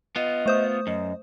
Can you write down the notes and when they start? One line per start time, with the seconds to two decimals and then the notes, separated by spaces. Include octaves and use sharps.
0.16 B3 F4 D#5
0.46 A3 C5 D#6
0.87 F#2 D#5